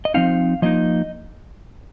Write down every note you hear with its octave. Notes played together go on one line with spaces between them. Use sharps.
D#5
F3 C4 D#4 F5
F3 A#3 D#4 D#5